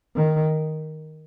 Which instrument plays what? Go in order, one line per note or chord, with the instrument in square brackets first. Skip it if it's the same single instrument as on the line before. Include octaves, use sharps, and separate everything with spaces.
[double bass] D#3